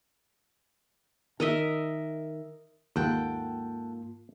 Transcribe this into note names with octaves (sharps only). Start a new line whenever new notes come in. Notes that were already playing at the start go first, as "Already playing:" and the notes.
D#3 A#4 D#5 E5
D#2 G#2 A#3 F4 A4 F#5 G5